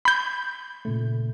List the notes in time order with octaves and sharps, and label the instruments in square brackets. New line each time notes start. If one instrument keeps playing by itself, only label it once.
[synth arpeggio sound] B5 G6
[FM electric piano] A#2 C#3 A3